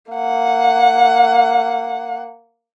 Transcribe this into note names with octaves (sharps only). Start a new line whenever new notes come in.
A#3 F#5